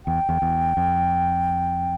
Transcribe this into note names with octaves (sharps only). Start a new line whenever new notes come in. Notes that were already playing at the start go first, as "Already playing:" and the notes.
E2 G5
E2
E2
F2